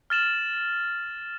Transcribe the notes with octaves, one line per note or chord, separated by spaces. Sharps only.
F6 A6 E7 F#7